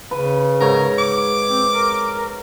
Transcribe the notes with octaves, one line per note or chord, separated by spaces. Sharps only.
C#3 B4
G#2 A#4 C#5
D6
C4
A#4